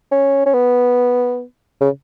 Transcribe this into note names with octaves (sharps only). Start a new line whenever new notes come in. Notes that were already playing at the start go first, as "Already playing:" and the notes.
C#4
C#4
B3
C#3